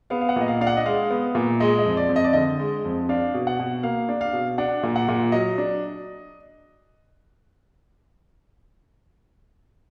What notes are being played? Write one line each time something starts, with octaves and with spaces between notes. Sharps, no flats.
B3 F5
F5
F#5
A#2 D#5
F5
D4 F5
F#5
D#5
G#3 F5
B3
A#2
G#3 D#5
D#5
F2
D5
F2
D#5
D5
D3 D#5
G#3
F2
D4 F5
B2
F#5
B2
A#3 F5
D4
F5
B2
D4 F#5
A#2
F#5
A#2
F#3 D#5
D4